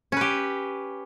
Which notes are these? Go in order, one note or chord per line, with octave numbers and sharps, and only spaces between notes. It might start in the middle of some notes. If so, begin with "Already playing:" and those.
C#4 G4 B4